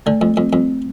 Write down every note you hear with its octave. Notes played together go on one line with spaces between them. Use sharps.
D3 A3
F2 A3
F2 C4
F2 C4